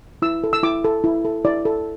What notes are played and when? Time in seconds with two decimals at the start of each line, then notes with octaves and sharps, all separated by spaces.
0.22 E4 E6
0.44 A4
0.53 E6
0.63 E4 D6
0.84 A4
1.04 E4
1.25 A4
1.45 E4 D5
1.65 A4